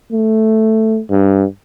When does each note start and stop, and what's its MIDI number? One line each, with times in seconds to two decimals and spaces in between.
0.12 1.01 57
1.10 1.44 43